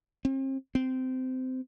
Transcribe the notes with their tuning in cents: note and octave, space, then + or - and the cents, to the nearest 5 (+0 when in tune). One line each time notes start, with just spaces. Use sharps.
C4 +40
C4 -20